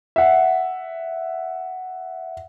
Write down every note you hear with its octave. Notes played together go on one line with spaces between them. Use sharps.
E5 F#5